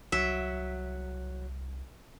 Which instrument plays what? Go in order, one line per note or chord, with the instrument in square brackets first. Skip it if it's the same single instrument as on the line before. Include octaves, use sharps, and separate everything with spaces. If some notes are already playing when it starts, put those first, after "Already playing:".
[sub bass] C2 [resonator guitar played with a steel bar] F#3 [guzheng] E5